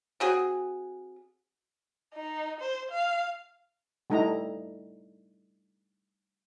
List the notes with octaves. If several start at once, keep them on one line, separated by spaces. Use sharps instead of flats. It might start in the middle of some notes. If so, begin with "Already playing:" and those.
C4 F#4 G#4
D#4
C5
F5
G3 A3 D#4 E4 A#5